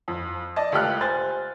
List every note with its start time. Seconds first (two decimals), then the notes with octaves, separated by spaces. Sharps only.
0.08 F2
0.56 D5 D#5 A5
0.72 C#2 A3 G4 A4 F6 F#6
1.01 C5 G#5 A6